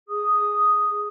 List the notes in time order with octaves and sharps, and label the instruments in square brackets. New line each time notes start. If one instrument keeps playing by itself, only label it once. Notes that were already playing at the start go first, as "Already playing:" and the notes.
[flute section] G#4 D#6